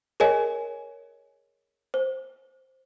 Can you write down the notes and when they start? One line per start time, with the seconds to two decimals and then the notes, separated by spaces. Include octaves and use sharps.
0.20 G#4 A#4 C#5 D#5 G#5
1.94 C5